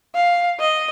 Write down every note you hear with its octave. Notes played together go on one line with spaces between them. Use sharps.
F5
D#5